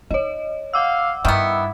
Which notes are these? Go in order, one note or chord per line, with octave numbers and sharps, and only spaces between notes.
D#4 C#5 D#5
F5 F#5 D6 E6
G2 D#3 B3 E4